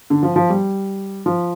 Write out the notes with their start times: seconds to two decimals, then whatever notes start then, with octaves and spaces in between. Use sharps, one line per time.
0.10 D3
0.23 F3
0.36 F3
0.49 G3
1.26 F3